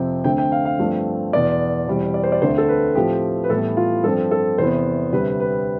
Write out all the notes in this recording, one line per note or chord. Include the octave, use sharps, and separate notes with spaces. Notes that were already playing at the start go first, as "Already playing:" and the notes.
Already playing: F2 C3 F3 C4 G5
D2 D3 A3 C4 G5
G5
F5
F5
G2 F3 A3 C4
E2 B2 B3 D5
E2 B2 G3 C4
D5
C5
D5
D2 D3 A3 C4 C5
A4
B4
A2 F3 A3 C4 G4
B4
A2 E3 G3 B3 A4
F4
G2 F3 C4 A4
A4
E2 C3 E3 B3 C5
D2 C3 G3 C4 B4
B4